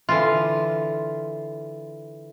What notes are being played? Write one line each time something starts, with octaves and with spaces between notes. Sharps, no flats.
D3 E3 F4